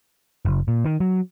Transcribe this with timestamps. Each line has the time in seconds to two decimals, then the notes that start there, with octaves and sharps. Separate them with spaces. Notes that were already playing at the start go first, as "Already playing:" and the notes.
0.45 F#1
0.68 A#2
0.85 D#3
1.00 F#3